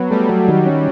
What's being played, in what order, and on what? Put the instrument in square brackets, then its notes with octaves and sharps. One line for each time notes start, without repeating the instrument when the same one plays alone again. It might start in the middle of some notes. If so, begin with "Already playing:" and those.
Already playing: [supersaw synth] F#3 [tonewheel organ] B3
[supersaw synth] G3 [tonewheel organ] A3
[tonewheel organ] F#3
D#3
C#4